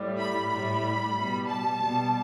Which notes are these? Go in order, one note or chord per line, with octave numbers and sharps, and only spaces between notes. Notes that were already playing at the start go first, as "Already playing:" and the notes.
Already playing: A2 G3
B5
A2 G3 B5
B2 G3
A5
B2 G3